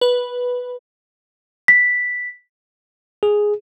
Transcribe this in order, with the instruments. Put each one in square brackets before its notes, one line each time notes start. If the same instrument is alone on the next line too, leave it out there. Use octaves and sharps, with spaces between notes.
[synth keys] B4
[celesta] B6
[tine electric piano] G#4